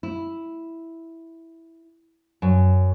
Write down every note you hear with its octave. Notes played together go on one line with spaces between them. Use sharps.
E4
F#2